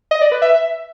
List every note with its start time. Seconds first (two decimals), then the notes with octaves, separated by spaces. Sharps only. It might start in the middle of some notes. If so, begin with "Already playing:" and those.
0.11 D#5
0.21 D5
0.31 B4
0.42 E5